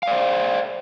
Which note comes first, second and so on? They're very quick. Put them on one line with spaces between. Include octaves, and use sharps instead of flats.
F5 D5 C5